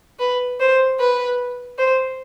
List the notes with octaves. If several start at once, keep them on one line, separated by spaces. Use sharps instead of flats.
B4
C5
B4
C5